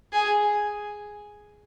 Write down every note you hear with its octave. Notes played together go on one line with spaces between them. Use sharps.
G#4